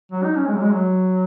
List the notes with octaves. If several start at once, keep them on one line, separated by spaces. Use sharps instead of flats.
F#3
D#4
C#4
G#3
F#3
G#3
F#3